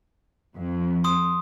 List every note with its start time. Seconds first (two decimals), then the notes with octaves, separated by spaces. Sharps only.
0.56 F2
1.04 C6 D#6